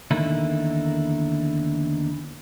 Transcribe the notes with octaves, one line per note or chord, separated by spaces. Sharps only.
E2 D3 D#3 A#3 D#4 E4